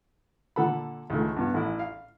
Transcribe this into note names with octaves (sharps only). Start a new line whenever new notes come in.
A#2 D3 A4 F#5 B5
C#2 D#3 A3
G2 B3
A1 E3 E4
F5